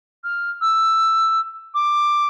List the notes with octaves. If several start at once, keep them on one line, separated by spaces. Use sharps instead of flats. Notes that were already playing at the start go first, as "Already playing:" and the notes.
F6
E6
D6